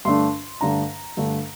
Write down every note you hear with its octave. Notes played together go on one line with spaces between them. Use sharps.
G2 D3 A3 D4 C6
G2 D3 A3 D4 A#5
G2 D3 A3 D4